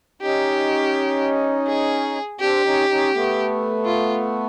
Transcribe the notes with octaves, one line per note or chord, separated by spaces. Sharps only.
C#4 D#4 G4
G#4
C4 D4 G4
C#4 D#4
C#4 D#4
A3 B3
F4